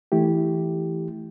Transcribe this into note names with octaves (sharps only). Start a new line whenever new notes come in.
E3 A3 E4 G4